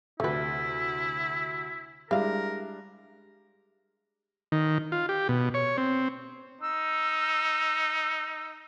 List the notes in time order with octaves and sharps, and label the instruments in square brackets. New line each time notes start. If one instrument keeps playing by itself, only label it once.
[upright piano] D2 C3 [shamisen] A3 B4 [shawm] E4
[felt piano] G3 G#3 [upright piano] D4 [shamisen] E4 F5 [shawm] A#4
[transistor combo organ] D#3
F4
G4
B2
C#5
C4
[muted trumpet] D#4 [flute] E6